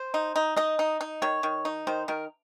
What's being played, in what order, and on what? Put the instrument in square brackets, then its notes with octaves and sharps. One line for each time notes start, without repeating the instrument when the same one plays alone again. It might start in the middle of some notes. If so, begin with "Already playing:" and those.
Already playing: [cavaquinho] C5
[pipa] D#4
D#4
[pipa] D#4 [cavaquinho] D#5
[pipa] D#4
D#4
[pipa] D#3 [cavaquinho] C#5
[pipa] D#3
D#4
[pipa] D#3 [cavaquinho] C5
[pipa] D#3 [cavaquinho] A#4